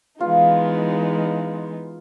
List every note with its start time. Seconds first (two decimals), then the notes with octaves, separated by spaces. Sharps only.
0.20 E3 G#3 B3 D#4 F4